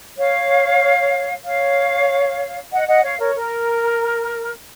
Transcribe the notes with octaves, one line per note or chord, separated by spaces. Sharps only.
C#5 F5
C#5 F5
D#5 F#5
D#5 F#5
C#5 F5
A#4 C#5
A#4